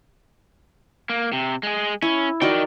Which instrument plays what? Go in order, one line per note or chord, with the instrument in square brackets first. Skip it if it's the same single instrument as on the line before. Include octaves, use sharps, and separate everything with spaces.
[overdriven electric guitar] A#3
C3
G#3 G#4
[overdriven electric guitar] C#4 [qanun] E4
[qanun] D#4 F#4 D5 [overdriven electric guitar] A#4 G5